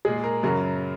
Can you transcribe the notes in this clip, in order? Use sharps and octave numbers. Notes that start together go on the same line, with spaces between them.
A#2 G#3 G#4
A#4
F#2 C#3 F#3 A#4